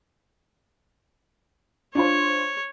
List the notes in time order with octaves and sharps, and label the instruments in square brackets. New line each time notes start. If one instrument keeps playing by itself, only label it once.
[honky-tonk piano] D4 F4 C5 [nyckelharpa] C#5